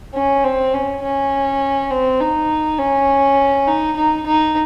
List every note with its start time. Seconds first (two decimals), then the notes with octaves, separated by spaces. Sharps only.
0.15 C#4
0.44 C4
0.73 C#4
1.02 C#4
1.90 C4
2.20 D#4
2.79 C#4
3.67 D#4
3.96 D#4
4.26 D#4